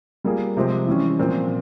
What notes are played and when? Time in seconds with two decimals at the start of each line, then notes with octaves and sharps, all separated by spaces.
0.24 G3 A#3 F4 G#4
0.57 C3 F3 G#3 C4
0.87 E3 G3 C#4
1.19 A#2 F3 C4